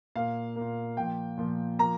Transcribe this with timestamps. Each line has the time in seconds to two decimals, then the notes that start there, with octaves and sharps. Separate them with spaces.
0.16 A#2 A#3 F5
0.56 A#3
0.61 A#2
0.97 A#2 F3 A#3 G5
1.37 A#2 F3 A#3
1.79 F3 A#3 A#5